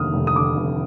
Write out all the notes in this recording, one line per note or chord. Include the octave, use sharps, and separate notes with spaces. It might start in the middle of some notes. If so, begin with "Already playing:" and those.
Already playing: F1 D#2 D3 D#6 F6
F1
D#6
D3 D6
F1